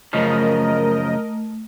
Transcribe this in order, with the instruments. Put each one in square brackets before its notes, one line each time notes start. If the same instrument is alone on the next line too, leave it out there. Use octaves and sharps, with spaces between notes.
[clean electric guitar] F#2 C#3 F3 [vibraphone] A3 [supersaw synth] A#4 D#5